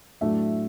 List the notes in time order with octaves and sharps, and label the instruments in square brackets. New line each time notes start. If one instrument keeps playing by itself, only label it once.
[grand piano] A2 F#3 A3 D4 E5